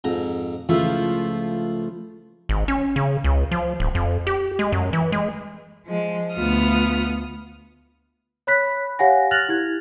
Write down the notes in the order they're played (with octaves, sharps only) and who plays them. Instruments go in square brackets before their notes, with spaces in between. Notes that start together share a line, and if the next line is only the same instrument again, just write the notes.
[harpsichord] F2 G#2 A#5
[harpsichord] C#2 E4 [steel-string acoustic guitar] F3 A3 F4
[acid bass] G#1
C#4
C#3
C#2
F3
D1
F2
G4
G#3
F#2
E3
G#3
[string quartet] F3 G#3
D2 B3 F4 D#6 F6
[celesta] C#5 B5 F#6 B6
G4 C#5 F5 F#5 G#5 A#6
F6 F#6 A6 A#6 F7 F#7
E4 G4 G#6